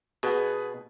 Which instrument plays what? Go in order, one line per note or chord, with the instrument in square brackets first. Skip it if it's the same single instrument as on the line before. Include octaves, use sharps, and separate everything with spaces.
[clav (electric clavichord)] B2 [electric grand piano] G#4 B4 F#5